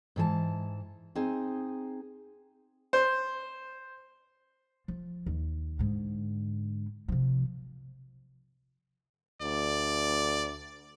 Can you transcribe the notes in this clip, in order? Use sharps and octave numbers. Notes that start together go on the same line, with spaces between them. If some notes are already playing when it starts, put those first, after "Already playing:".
G#2 E3 A4 A5
C4 D#4 G#4
C5
F3
D#2
G#2 D3
C3 F3
D2 D5